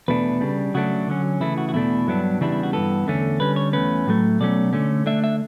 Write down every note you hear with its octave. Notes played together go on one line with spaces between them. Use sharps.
E2 B2 A3 D4 B4
C#3 G3 D4
C#3 F#3 A3 D4 F#4
D3 F#3 C#4
C#3 E3 A3 E4
F#4
F#4
E2 B2 A3 D4 E4
G2 F#3 B3 D4
E2 C#3 E3 G3 D4 E4
E4
F#4
G2 E3 B3 A4
E2 D3 A3 C#4
D3 G3 C#4 B4
C#5
E2 B2 A3 C#4 B4
A2 F#3 A3
B2 F#3 A3 C#4 D5
D3 A3 C#4
D3 A3 D4 E5
E5